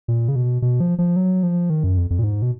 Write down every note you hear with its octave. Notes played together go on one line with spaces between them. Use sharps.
A#2
C#3
B2
B2
F3
F3
F#3
F3
D#3
F#2
F2
F2
A#2
G#2
B2